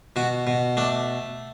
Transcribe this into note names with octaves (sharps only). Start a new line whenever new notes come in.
B2 F#4
B2
A3 D4